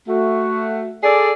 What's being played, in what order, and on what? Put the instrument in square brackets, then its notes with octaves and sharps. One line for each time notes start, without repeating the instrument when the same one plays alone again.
[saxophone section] A3 F#4
G#4 A4 D5